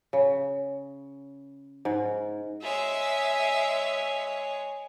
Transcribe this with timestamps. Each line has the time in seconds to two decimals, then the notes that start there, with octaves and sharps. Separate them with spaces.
0.13 C#3
1.85 G#2
2.63 G#3 C#5 E5